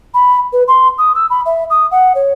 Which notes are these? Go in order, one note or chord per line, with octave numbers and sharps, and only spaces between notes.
B5
B4
C6
D#6
E6
B5
E5
D#6
F#5
C#5